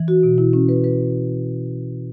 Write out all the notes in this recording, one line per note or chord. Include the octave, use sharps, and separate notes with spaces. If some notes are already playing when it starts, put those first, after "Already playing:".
Already playing: E3
F#4
B2
E4
C#4
B4
B4